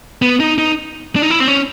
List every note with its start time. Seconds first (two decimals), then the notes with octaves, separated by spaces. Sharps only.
0.22 B3
0.40 D#4
0.58 D#4
1.16 D4
1.22 D#4
1.30 E4
1.40 C4
1.48 C#4